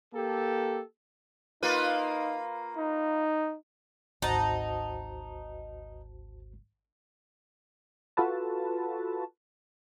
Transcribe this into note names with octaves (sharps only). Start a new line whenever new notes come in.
A#3 G4 A4
A#3 D#4 F4 B4
D#4
G#1 D2 D#4 F#4 C5 F#5 A5 A#5
F4 F#4 A4 B4 A5